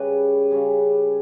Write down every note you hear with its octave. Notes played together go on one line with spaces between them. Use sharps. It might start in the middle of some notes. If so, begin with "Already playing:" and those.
Already playing: C#3 G3 C#4 B4 C#5
C#3 G3 C#4